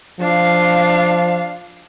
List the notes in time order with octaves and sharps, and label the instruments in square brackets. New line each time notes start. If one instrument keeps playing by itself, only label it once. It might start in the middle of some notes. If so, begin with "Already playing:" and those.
[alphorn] F3 [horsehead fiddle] D4 F5